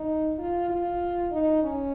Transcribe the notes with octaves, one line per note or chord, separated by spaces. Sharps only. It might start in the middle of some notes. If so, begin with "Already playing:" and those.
Already playing: D#4
F4
F4
D#4
C#4